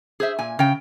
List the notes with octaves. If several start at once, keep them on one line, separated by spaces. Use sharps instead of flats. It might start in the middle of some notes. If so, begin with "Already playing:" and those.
G#4 C5 E5
A#2 G#5
C#3 G5